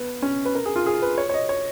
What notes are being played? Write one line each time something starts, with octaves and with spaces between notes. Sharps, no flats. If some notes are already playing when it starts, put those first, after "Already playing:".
Already playing: B3
C#4
B4
A#4
G#4
F4
G#4
B4
C#5
C#5
D#5
C#5